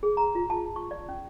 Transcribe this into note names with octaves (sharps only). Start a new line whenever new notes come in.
G#4
A#5
F4
A5
C#6
D5
C#4